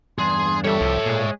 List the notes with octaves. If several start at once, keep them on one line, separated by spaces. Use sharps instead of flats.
E2 G2 D4 G#4 C6
G3 A4 C#5 E5
C2 F3 G4
A#2 G#3 G#4